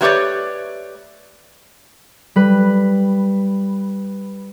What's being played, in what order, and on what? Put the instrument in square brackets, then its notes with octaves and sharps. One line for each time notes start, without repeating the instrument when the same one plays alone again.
[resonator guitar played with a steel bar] F#3 A3 G4 B4 C#5 D5
[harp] G3 B4